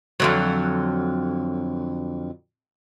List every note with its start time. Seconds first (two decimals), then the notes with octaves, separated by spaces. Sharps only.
0.20 F2 D3 F#3